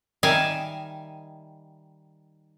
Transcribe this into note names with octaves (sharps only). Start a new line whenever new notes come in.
D#3 G3 D#4 E5 F5 G#5